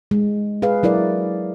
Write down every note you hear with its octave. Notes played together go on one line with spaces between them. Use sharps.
G#3
G#4 B4 F5
F#3 E4 A#4 D5